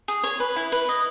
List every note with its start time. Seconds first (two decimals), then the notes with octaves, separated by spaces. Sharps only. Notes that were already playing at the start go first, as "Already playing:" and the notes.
0.08 G#4
0.23 C#5
0.40 B4
0.56 E4
0.72 B4
0.89 D#5